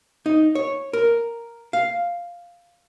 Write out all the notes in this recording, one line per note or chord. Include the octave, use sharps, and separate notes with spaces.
D#4
C#5
A#4
F5